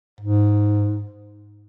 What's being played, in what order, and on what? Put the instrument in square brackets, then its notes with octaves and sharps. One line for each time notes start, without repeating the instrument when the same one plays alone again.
[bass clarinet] G#2